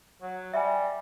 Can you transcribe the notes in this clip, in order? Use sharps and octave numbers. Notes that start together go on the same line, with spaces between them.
F#3
G3 E5 G#5